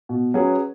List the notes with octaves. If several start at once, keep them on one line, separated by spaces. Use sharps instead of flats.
B2
F#3 C#4 G#4 B4